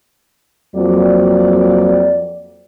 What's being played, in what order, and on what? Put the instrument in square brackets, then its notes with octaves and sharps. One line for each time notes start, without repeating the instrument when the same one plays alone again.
[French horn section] F2 F#3 A#3 D5